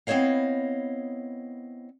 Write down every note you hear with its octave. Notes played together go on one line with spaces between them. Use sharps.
B3 C4 E4 C#5 D#5 F5